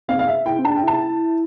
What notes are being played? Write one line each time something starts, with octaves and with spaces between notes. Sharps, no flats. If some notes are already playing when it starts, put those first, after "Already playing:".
C4 F5
F5
E5
E4 G5
C4
D4 A5
G5
E4 A5